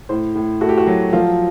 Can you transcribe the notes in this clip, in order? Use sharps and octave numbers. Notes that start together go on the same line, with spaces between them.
A2 C5
A2
A3 F#4
G4
F#4
F#3
F3 F4